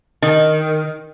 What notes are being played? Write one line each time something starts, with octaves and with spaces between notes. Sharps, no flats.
D#3